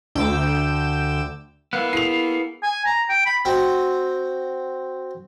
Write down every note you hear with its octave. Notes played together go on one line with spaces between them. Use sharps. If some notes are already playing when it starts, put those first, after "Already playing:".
D2 G5 D6 E6
A#3 B3 E4 F5 F#6
E4 G#4 A4 C7 F7
G#5
A#5
G5
B5
C4 F#4